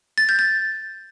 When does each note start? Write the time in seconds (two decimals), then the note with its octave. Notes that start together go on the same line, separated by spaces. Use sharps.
0.18 A6
0.29 G6
0.39 A6